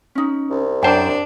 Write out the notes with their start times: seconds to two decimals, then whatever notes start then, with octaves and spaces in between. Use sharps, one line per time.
0.15 C#4 D#4
0.50 C2
0.83 F#2 D4 C5 G5 A5